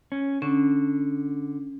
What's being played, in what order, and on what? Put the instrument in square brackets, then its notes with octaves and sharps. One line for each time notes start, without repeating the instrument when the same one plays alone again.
[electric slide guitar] C#4
[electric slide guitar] D3 [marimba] C#4